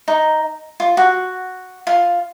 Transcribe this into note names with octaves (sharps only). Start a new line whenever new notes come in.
D#4
F4
F#4
F4